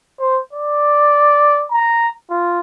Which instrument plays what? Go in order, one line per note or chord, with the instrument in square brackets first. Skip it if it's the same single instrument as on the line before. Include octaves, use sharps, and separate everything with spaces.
[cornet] C5
D5
A#5
F4